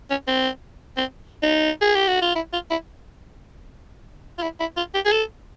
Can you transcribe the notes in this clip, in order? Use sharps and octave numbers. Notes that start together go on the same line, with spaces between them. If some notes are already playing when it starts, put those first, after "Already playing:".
C#4
C4
C4
D#4
G#4
G4
F#4
F4
E4
F4
E4
F4
E4
E4
F4
G4
G#4
A4